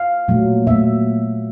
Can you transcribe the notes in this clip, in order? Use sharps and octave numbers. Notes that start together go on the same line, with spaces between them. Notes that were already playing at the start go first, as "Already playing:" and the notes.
Already playing: F5
A#2 F#3 A3
A#2 F#3 A3 E5